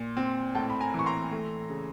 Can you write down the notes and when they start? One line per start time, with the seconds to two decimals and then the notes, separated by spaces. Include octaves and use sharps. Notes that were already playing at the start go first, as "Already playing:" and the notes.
Already playing: A#2
0.17 C4
0.55 A2 G5 A5
0.70 B5
0.80 G#5 A#5
0.94 E3 C#6
1.06 A#5 C6
1.32 A3
1.70 C#3